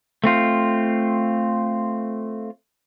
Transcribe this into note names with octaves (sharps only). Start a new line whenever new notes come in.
A3 C4 F4